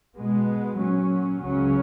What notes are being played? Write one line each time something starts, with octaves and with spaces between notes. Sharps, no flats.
B2 G#3 B3
A#2 F#3 C#4
C#2 C#3 F#3 C#4